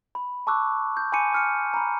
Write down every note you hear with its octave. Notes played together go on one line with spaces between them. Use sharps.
B5
A5 C#6 D6 E6 F#6
G6
G#5 B5 C6 D6 C#7 D#7
D6 F6 C#7
A#5 B5